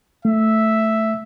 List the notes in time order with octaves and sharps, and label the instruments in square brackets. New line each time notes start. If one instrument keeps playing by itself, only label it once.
[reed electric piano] A3 [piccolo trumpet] E5